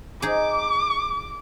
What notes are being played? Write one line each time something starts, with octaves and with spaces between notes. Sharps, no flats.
D#4 G#4 D6